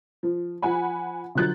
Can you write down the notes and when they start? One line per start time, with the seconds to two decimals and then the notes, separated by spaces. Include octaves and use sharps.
0.23 F3
0.62 F3 F#5 G#5 B5
1.35 D3 F3 F#3 F#6 G6 A6